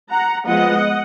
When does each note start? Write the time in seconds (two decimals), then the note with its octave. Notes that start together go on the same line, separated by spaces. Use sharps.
0.12 F#5 A#5
0.48 F3 G#3 B3 D#5 F#5